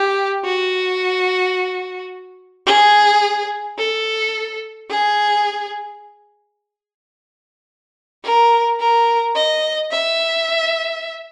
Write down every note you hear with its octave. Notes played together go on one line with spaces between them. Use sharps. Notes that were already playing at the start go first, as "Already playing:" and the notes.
Already playing: G4
F#4
G#4
A4
G#4
A#4
A#4
D#5
E5